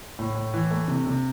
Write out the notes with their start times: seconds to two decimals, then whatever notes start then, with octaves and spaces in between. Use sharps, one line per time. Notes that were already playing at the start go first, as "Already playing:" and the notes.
0.19 A2
0.35 A2
0.54 E3
0.71 A3
0.88 C3
1.07 C3